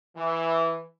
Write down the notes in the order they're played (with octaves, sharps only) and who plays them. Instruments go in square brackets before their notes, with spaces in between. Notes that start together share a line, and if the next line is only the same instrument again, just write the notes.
[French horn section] E3